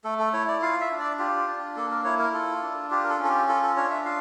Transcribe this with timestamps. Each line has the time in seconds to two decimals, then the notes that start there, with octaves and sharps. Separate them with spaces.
0.04 A3 A4
0.19 A4
0.33 E4 C#5
0.48 D5
0.62 F4 F5
0.81 E5
0.91 D4
1.00 D5
1.19 F4 G4
1.47 D4
1.76 A#3 A4
1.91 A#4
2.04 E4 C#5
2.19 A#4
2.33 F4 A4
2.62 D4
2.91 F4 G4
3.04 A#4
3.09 A4
3.19 C#4
3.24 A4
3.29 G4
3.49 F4 A4
3.63 A4
3.76 D4 C#5
3.91 E5
4.05 F4 F5